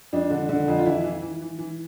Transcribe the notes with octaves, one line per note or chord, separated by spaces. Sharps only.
F2 D4
D3
D3
F2
F4
E3 E4
E3
E3
E3
E3